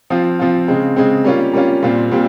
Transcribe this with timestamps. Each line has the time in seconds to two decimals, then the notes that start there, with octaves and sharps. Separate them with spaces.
0.10 F3 C4 F4
0.39 F3 C4 F4
0.68 C#3 G#3 C4
0.96 C#3 G#3 C4
1.24 G3 A#3 C#4 F4
1.53 G3 A#3 C#4 F4
1.82 A#2 G3 C4 F4
2.12 A#2 G3 C4